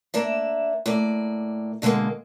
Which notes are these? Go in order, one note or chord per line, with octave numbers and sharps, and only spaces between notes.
A#3 D4 E5
A2 A#3 D5
B2 D3 F#3 G#3 A#3